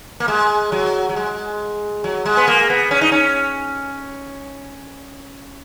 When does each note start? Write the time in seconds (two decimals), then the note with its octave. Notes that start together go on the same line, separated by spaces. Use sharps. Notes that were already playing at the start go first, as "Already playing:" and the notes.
0.20 A#3
0.28 G#3
0.72 F#3
1.09 F#3
1.16 G#3
2.04 F#3
2.25 G#3
2.37 B3
2.48 A#3
2.70 B3
2.91 C#4
3.01 D#4
3.12 C#4